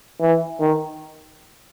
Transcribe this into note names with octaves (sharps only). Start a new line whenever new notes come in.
E3
D#3